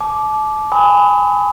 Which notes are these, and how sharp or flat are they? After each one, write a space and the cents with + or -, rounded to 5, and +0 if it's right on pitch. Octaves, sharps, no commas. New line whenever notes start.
A5 -35 D6 +0
G#5 -25 B5 +25 D#6 +40